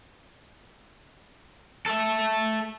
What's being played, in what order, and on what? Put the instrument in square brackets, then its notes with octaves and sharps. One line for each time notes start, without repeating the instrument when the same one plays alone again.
[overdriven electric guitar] A4 E5